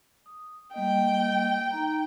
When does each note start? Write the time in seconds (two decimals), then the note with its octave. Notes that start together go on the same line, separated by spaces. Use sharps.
0.26 D#6
0.74 G3 A#3 D#5 G5
1.71 D#4 A#5